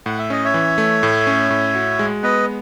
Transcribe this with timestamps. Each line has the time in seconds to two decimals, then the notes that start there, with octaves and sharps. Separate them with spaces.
0.06 A2 F#5
0.18 E5
0.30 C#4 D#5
0.45 C#5 E5
0.54 E3
0.78 A3
1.03 A2
1.27 C#4
1.50 A2
1.75 F#4
1.99 G#3
2.23 B3 B4 D#5